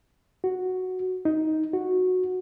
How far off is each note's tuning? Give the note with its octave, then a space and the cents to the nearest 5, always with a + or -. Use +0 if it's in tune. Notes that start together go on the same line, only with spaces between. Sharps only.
F#4 +0
D#4 +10
F#4 -10